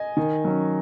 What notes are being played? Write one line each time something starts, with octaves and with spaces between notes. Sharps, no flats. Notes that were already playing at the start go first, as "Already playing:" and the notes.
Already playing: D#5 G#5
D#3
F#3 C#4